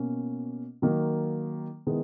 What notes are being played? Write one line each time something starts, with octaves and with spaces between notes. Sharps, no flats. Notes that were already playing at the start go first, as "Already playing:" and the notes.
Already playing: B2 A#3 C#4
D#3 F#3 A#3
D#3 G#3 B3 E4